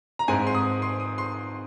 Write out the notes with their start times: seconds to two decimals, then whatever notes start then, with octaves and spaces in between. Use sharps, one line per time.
0.19 A#5
0.28 G#2 G#3 C4 G#5
0.47 C6
0.55 D#6
0.82 C6
1.00 D#6
1.18 C6